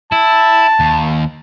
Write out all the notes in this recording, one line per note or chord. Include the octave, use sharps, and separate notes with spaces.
E4 A5
D#2